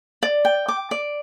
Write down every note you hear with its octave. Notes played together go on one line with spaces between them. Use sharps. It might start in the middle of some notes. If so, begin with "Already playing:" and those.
D5
G5
D6
D5